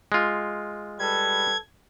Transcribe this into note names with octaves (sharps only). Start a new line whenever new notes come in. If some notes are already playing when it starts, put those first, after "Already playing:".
G#3 F4
G3 A4 B4 G#6